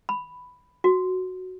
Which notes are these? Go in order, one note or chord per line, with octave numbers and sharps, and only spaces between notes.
B5
F#4